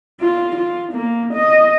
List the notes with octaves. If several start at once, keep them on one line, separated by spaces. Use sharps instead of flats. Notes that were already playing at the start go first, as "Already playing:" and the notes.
F4
F4
A#3
D#5